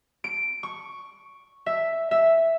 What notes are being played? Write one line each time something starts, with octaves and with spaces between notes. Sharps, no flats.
D7
C#6
E5
E5